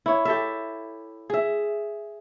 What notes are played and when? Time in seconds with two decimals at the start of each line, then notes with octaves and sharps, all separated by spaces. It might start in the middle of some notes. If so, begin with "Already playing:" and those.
0.06 E4 C#5
0.25 G4 A4 E5
1.30 G#4 E5